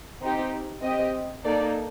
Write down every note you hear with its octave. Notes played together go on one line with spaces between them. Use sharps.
C4 D#4 G4
C4 G4 D#5
A#3 D#4 A4 D5